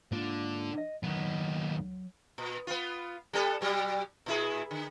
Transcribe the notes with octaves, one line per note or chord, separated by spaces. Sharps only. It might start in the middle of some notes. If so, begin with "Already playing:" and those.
G#2 D3 A#3 F4
D#5
D#2 F#3 B3
A#2
B3 F4
G3 B3 A4
B2 F#3 G3
A#2 E4 G#4
D3